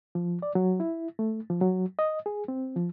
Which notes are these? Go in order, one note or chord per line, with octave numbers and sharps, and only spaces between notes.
F3
D5
F#3
E4
A3
F3
F#3
D#5
G#4
C4
F3